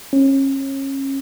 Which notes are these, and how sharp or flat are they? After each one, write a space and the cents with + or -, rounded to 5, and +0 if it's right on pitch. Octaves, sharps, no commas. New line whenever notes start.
C#4 -30